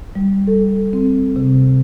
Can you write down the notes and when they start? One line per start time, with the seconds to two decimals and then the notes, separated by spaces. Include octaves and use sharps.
0.15 G3
0.47 A4
0.93 C4
1.36 C3